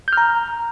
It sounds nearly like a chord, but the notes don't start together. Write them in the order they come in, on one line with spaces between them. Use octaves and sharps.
G6 F6 A#5